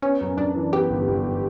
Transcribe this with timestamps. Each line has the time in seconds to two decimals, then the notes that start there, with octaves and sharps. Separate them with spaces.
0.02 B3 C#4
0.21 F#2
0.37 F#2 D4
0.55 E3
0.72 B3 G4
0.90 G1
1.08 G1